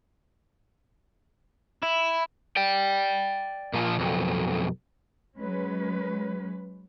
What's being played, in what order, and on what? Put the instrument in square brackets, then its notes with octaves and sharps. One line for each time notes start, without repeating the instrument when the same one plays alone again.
[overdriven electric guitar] E4
D5 G5
A#2 F3
B1 F2
[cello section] F#3 G#3 C#4 B4